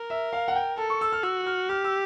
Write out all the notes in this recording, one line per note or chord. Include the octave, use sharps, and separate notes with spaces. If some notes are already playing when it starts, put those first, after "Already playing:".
Already playing: A#4
E5
F5
F#5
G5
A4 A5
C#6
E6
F6
F#4 E6
F6
G4 F6
E6